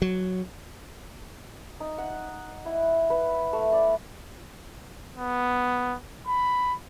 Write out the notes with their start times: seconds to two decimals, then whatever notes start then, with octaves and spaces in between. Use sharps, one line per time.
0.02 F#3
1.80 D#4
1.98 F#5
2.66 E4
3.10 B4
3.53 A3
3.72 D5
5.16 B3
6.27 B5